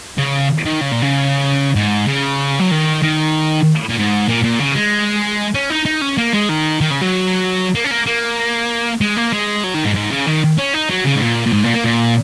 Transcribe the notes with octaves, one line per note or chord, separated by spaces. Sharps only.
C#3
D#3
C#3
A#2
C#3
G#2
C#3
F#3
D#3
D#3
A#2
G#2
A#2
A#2
C#3
G#3
C#4
D#4
D#4
C#4
A#3
G#3
D#3
D#3
C#3
F#3
A#3
C#4
A#3
A#3
G#3
A#3
G#3
F#3
D#3
G#2
G#2
C#3
D#3
C#4
D#4
F#3
C#3
G#2
A#2
A#2
G#2
A#2
A#3
A#2